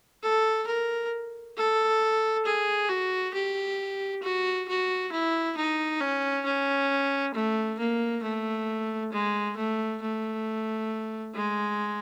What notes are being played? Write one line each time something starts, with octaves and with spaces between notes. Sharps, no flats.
A4
A#4
A4
G#4
F#4
G4
F#4
F#4
E4
D#4
C#4
C#4
A3
A#3
A3
G#3
A3
A3
G#3